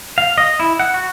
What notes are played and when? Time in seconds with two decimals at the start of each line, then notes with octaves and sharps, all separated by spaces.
0.18 F5
0.38 D#5
0.60 E4
0.80 F#5
0.94 F#4